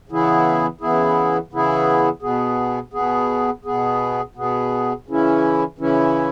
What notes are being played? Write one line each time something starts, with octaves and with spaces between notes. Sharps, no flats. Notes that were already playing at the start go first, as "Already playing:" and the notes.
C#3 E3 B3 E4 G#4
C#3 E3 B3 E4 G#4
C#3 E3 B3 E4 G#4
B2 B3 G#4
B2 B3 G#4
B2 B3 G#4
B2 B3 G#4
C#3 E3 C#4 E4
C#3 E3 C#4 E4